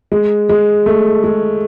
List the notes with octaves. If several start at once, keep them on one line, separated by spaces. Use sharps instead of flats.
G#3
G#3
A3
G#3